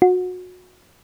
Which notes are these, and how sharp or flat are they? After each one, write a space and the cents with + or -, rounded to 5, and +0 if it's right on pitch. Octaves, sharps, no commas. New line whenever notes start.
F#4 -25